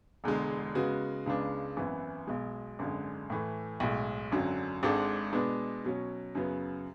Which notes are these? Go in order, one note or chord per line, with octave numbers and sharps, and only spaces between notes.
E1 E2 D3 G#3
C#3 G#3 B3 F#4
C#2 C#3 G#3 B3 D4
G#1 F#2 E3 B3 E4
B1 B2 G#3
G#1 F#2 D3 G#3
A2 E3 A3
B1 A2 G#3
G#1 F#2 D3 F#3
G#1 G#2 G#3 D4 A4
B2 G#3 B3 D4
B2 F#3 C#4
F#2 C#3 F#3 B3